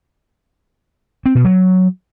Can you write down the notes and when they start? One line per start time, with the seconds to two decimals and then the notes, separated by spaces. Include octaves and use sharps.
1.26 C4
1.35 B2
1.45 F#3